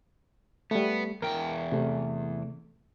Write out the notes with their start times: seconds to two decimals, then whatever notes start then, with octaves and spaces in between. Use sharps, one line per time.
0.71 G3 A3 B3
1.22 E2 A#4 G5
1.72 C3 A3